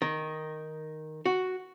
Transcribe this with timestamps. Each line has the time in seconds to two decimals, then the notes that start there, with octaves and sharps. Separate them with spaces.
0.02 D#3
1.25 F#4